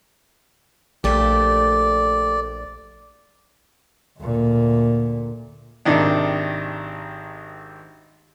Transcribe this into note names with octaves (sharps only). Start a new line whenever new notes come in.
A#1 A3 G4 D5
D2 A#2
G#1 C3 D#3 D4